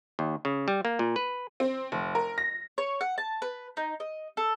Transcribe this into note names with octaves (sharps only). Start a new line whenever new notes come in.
D#2
C#3
G3
A#3
A#2
B4
C4
F1
A#4
A#6
C#5
F#5
A5
B4
D#4
D#5
A4